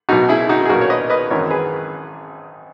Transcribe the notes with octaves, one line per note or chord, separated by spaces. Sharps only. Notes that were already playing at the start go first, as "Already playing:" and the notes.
B1 B2 D#4 F#4
E4 G#4
D#4 F#4
G#4
B1 A#2 F#4 A#4
C#5
B4 D#5
B4 D#5
G#1 F#2 E3 A#4 C#5
G#4 B4